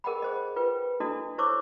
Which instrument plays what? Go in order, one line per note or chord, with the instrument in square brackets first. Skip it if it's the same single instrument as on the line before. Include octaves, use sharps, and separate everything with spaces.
[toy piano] G#4 A#4 D#5 F#5 G5 B5
G#4 C5 D#5
F4 B4 G5
D4 E4 F#4 A4 D#5
E4 C5 C#5 C#6 D6 E6